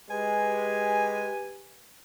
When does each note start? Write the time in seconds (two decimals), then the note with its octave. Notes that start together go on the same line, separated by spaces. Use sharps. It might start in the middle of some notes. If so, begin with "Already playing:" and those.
0.10 G#3 G4 B4 G#5